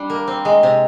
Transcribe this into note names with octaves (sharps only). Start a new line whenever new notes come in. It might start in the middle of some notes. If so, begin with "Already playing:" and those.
Already playing: G3 D4 G4
A#3
C4
G#3
C3